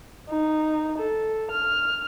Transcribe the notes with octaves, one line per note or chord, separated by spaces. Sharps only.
D#4
A4
F6